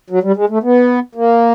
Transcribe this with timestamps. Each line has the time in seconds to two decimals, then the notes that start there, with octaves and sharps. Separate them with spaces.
0.10 F#3
0.23 G3
0.36 G#3
0.49 A3
0.63 B3
1.15 A#3